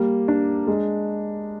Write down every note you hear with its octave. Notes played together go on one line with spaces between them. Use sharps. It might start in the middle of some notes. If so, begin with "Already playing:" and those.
Already playing: G3 A#3
D4
G#3